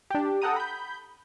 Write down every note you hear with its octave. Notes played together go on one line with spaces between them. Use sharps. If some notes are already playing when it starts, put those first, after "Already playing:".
D4 G4
A4 F#5 G5 A#5 D#6
B5 G6